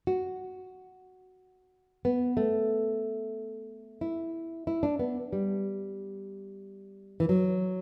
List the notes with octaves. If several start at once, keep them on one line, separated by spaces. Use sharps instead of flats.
F#4
B3
A3
E4
E4
D4
B3
G3
E3
F#3